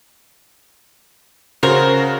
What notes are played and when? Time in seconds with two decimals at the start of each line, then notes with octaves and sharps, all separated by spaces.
1.63 C#3 F#4 A#4 C5